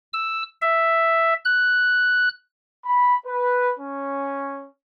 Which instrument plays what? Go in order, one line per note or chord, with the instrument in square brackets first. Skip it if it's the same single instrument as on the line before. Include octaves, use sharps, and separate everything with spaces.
[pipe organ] E6
E5
F#6
[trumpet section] B5
B4
C#4